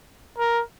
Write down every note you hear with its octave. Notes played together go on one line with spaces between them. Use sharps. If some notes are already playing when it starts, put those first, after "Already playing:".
A#4